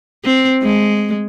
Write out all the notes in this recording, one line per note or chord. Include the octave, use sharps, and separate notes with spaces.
C4
G#3